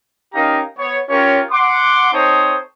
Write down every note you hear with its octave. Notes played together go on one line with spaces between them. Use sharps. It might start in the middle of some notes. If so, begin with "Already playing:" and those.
C#4 D#4 G4 A#4 F5 A#5
B3 C#5
C#4 F4 G4 A#4 C#5
F#5 C6 D6
C4 D#4 A4 C5 C#5 D#6